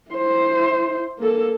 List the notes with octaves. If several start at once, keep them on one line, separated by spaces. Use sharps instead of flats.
E4 C5
A#3 A4